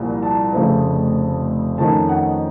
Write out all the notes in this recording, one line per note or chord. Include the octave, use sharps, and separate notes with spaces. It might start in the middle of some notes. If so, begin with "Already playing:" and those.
Already playing: C2 A#2 F3 A#3
A5
F1 F2 C#3 A3 C4
F2 D#3 A3 C#4 A5
F#5